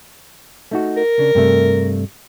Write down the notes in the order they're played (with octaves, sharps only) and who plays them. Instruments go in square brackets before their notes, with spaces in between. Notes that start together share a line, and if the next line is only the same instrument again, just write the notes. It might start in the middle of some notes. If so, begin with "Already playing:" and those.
[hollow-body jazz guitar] A3 D#4 F#4
[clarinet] A#4
[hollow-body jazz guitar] C#3 D4
G2 C3 A3